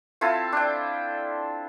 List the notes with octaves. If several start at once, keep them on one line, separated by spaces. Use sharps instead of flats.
C4 E4 F4 A4
D4 G5